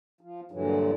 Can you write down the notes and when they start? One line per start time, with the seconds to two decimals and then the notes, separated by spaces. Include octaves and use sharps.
0.21 F3
0.52 G2 A#2 D3 E3 F#3